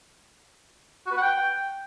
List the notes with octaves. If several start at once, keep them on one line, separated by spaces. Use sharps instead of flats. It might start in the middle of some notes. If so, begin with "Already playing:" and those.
F#4
B4
F#5
G5